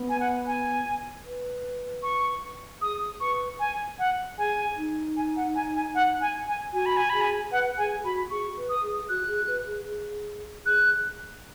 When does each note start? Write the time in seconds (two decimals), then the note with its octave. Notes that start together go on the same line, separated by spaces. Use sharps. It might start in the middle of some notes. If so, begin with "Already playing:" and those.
Already playing: B3
0.09 G#5
0.20 F#5
0.46 G#5
1.25 B4
2.03 C#6
2.81 G#4 D#6
3.20 B4 C#6
3.59 G#5
3.99 F#5
4.38 G#4 G#5
4.77 D#4
5.16 G#5
5.36 F#5
5.55 G#5
5.75 G#5
5.95 F#5
6.21 G#5
6.47 G#5
6.73 F#4 G#5
6.86 B5
6.97 G#5
7.10 G#4 B5
7.21 G#5
7.52 B4 F#5
7.78 G#4 G#5
8.04 F#4 B5
8.31 G#4 C#6
8.57 B4
8.69 D#6
8.83 G#4
9.09 F#4 F#6
9.28 G#4
9.47 B4
9.67 G#4
9.88 G#4
10.66 G#4 F#6